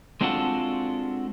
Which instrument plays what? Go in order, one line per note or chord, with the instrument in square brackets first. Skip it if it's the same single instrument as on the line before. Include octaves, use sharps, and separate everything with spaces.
[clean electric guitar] G#3 C4 D4 F4 F#4 A4